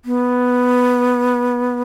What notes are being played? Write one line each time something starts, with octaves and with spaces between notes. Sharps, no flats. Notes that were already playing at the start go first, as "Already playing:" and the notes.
B3